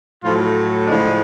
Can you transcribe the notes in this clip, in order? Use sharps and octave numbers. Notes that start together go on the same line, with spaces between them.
A2 F3 F#3 A3 F4
A2 D3 F3 G#3 D4